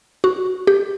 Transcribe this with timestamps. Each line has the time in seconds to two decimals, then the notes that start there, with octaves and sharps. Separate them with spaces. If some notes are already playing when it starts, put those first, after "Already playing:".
0.24 F#4
0.67 G4